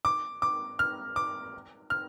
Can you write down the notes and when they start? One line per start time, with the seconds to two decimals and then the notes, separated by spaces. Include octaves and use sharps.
0.05 D6
0.42 D6
0.79 F6
1.16 D6
1.90 F6